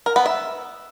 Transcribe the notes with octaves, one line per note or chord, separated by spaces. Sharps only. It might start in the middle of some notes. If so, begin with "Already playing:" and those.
A#4
B3
E5